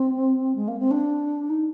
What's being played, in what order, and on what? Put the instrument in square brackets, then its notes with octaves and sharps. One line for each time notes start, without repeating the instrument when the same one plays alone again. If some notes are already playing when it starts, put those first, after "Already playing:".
Already playing: [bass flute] C4
G#3
A#3
C4
D4
D#4